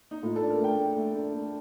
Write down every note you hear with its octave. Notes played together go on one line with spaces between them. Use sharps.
D#4
A2 F4
A4
D4
A#4
A3 G5
A3
A3
D4
A3